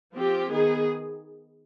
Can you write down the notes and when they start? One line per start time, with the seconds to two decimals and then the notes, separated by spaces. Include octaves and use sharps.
0.16 F3 C4 F4 G4
0.50 D#3 B3 D#4 G#4